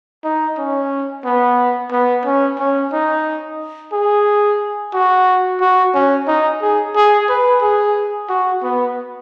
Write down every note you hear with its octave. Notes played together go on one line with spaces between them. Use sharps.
D#4
C#4
B3
B3
C#4
C#4
D#4
G#4
F#4
F#4
C#4
D#4
G#4
G#4
B4
G#4
F#4
B3